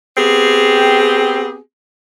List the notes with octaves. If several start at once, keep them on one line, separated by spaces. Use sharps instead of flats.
B3 C4 G4 G#4